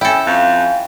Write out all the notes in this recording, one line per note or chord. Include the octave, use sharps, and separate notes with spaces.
C#4 E4 A4 G5
F2 F5